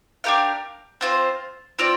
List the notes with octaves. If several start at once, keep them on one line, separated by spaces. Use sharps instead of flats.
D4 G4 A#4 F5
C4 F4 C5
C4 F4 D5